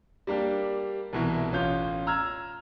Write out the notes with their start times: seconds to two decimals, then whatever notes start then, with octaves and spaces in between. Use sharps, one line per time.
0.27 G3 A#3 D4 G4
1.13 C2 B2 E3
1.52 A1 C#4 F4 G6
2.07 A#5 E6 F6 G#6